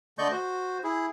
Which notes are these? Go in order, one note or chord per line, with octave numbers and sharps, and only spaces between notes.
D3 A3 D5 D#5 C#6 G6
F#4 C5
E4 G#4